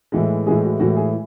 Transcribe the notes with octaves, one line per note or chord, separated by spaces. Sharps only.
A2 E3 G#3
A2 E3 G#3 G#4
F#4
A2 E3 G#3 F#4
G#4